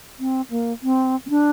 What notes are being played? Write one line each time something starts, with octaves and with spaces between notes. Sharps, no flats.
C4
A#3
C4
C4
D4